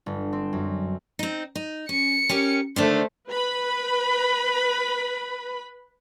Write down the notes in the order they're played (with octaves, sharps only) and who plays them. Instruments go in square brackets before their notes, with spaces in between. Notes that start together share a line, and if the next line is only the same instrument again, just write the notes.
[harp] G1
C4
F#2
[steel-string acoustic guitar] C4 D#4
D#4
[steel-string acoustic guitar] C#4 [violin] C#7
[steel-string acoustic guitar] C#4 G4 A#4
[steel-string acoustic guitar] D3 D#3 D4 [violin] A3 C5
[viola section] B4 B5